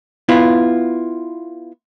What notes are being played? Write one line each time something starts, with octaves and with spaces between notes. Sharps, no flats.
B3 E4 F4